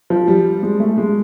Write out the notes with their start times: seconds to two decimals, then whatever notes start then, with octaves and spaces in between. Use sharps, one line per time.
0.10 F3
0.28 G3
0.63 G#3
0.80 A3
0.98 G#3